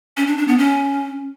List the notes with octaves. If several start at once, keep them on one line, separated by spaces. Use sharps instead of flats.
C#4
D4
D4
B3
C#4